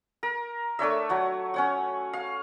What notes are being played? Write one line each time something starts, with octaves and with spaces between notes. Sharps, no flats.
A#4
A3 D4 C#5 E5
F#3 C#5 F#5
C#4 C#5 F#5
F5